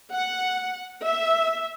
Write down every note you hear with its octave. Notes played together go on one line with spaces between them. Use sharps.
F#5
E5